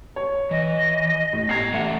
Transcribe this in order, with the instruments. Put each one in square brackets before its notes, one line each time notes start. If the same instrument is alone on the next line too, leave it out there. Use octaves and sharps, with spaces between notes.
[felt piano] C#5
[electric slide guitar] E3 [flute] D#5
[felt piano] A2
[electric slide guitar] B3 A#5 [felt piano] G#6 C7
[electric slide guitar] E2 G#2 A3 [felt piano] E5 F#5